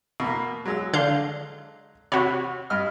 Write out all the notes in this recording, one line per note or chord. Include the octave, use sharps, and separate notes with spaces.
B2 A#3
F#3 G#3 E6
D3 F5 G6
C3 F#4 C#5 B5
G2 D#5 F6